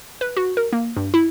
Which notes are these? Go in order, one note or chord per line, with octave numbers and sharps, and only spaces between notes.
B4
F#4
A#4
A#3
G2
E4